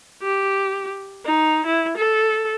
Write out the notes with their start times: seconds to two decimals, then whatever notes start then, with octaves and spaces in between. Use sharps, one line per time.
0.23 G4
1.26 D#4
1.66 E4
1.98 A4